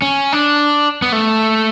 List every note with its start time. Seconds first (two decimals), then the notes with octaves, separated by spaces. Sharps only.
0.02 C#4
0.32 D4
1.02 B3
1.12 A3